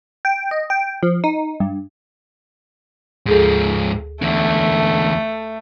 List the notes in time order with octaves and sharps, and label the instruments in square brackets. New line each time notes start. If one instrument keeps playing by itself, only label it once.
[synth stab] G5
D#5
G5
F3
D#4
G2
[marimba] D2 G#4 A4 [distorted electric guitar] G#2 F3
[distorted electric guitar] E2 D3 [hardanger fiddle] A3